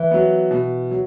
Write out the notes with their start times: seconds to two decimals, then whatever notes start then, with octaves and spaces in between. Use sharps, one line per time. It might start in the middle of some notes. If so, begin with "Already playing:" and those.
Already playing: E3
0.11 F#3 B3
0.51 B2
0.91 F#3